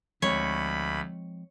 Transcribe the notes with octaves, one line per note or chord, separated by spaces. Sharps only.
D2 F3 G#3 C4 C#5 B5